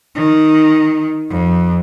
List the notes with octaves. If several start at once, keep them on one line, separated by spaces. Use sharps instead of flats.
D#3
F2